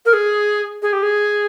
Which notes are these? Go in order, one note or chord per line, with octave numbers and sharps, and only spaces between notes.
A#4
G#4
G#4
G4
G#4